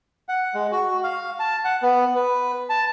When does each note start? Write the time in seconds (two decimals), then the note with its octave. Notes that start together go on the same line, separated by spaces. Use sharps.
0.29 F#5
0.54 G#3
0.72 F#4
1.04 F5
1.40 A5
1.65 F#5
1.82 B3
2.15 B4
2.70 A5